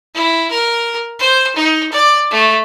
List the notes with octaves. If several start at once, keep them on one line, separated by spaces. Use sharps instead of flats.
E4
A#4
C5
D#4
D5
A3